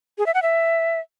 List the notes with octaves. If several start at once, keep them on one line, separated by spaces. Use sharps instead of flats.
G#4
E5
F#5
E5